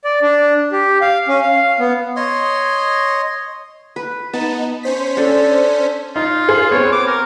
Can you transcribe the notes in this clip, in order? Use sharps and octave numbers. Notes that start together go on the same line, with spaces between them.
D5
D4
G4
F5
C#4
F5
B3
C#5 D#5 C6
B4
B3 D#4 A5
C#4 C5 B6
D4 A4
D#4 F4
G#4 C5
B3 C4 C#5
D6
A#4